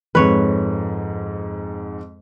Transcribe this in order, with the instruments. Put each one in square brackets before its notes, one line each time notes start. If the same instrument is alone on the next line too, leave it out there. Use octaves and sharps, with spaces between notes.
[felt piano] F2 G#2 [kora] B4 C#5